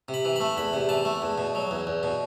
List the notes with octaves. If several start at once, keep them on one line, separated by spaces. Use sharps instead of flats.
C3
B5
E3
A3 B5
E2 B5
C3
E3 A5
A3
E2
B2
F#3
E2
E2
B2